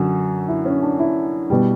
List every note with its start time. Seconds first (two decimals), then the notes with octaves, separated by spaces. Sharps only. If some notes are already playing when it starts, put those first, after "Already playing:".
Already playing: F#2 D3 F#4
0.48 E4
0.66 C#4
0.82 D4
0.99 E4
1.50 B2 G3